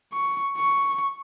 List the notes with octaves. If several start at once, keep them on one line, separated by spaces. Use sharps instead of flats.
C#6
C#6